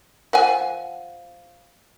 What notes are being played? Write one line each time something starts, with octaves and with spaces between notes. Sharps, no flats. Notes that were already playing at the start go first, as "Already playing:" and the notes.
F3 F#5 G#5